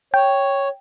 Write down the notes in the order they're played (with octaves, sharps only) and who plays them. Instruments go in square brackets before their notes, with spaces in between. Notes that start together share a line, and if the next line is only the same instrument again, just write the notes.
[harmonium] C#5 [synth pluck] G5